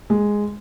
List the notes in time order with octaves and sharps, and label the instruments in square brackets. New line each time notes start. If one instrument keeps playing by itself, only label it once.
[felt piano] G#3